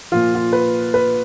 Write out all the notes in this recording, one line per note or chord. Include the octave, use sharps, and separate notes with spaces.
A#2 F3 F4
F4
B4
B4